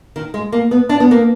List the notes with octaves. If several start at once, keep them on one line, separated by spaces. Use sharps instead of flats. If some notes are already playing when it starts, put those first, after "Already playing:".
D#3
G#3
A#3
B3
D4
B3
A#3